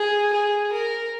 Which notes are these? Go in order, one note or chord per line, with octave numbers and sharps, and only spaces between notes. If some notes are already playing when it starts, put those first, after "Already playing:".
Already playing: G#4
G#4
A#4